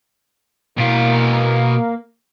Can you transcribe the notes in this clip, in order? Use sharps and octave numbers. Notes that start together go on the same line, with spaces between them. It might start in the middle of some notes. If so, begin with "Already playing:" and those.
B2 A#3 F5